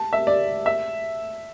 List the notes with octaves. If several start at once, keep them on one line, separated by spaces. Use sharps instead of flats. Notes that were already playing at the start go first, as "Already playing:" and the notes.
Already playing: A5
E5
D5
E5